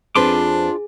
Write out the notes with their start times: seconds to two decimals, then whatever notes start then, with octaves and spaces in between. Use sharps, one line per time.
0.15 F2 C4 D4 F4 G#4 B4 C6 D6